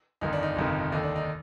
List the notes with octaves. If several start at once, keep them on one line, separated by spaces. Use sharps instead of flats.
G1 F2 D#3 D#4
D4
D#4
G1 F2 C3 D#3
D#2 D3 D#4
D4
D#4